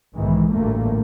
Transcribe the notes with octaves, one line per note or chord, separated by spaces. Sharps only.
B1 G#2 D#3 E3 G#3
A1 D2 G2 A#2 A3 A#3